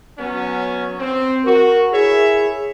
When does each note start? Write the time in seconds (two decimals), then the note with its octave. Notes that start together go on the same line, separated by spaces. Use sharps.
0.18 F#3 B3 C#4
0.98 C4
1.45 F#4 A#4
1.92 E4 G#4 C#5 E5